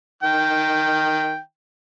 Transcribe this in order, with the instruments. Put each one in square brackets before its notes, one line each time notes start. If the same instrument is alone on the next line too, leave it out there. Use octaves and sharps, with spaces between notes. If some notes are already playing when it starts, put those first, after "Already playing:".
[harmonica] D#3 G5